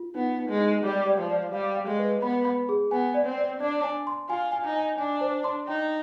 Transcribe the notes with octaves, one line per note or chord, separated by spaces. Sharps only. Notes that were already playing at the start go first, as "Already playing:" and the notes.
Already playing: F4
B3 D#4
D#4
G#3
D#4
G3 D5
D5
F3
D5
G3 F5
F5
G#3
B4
B3 B5
B5
G#4
B3 G#5
D5
C4
D5
D4 D5
G#5
C6
F4 G#5
G#5
D#4
G#5
D4 G#5
C5
C6
D#4 G5